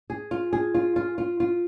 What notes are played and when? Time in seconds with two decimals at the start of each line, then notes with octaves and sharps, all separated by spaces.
0.10 G#4
0.31 F4
0.53 G#4
0.74 F4
0.96 F4
1.18 F4
1.40 F4